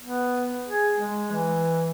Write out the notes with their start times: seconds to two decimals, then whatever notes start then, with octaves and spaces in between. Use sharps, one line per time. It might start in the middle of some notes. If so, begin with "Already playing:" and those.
0.02 B3
0.68 G#4
0.95 G#3
1.32 E3